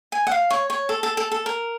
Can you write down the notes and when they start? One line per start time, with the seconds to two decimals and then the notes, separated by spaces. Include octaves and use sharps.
0.12 G#5
0.27 F#5
0.31 F5
0.51 C#5
0.70 C#5
0.89 A4
1.03 A4
1.17 A4
1.32 A4
1.46 A#4